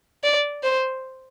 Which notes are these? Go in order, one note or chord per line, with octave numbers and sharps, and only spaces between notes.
D5
C5